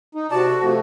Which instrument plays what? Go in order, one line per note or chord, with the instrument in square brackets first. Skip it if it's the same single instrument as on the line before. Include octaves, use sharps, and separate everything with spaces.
[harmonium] D#4
[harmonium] C3 D5 A5 [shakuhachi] F#4
[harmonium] A4
C3 F3 A3